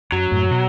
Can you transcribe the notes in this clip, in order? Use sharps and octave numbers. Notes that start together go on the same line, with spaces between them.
F#2 F#3
F#2 A2
B2